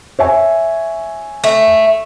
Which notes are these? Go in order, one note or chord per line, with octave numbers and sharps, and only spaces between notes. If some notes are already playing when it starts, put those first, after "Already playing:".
C#5 E5 G#5
A3